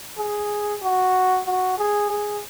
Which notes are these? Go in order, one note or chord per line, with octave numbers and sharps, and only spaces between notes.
G#4
F#4
F#4
G#4
G#4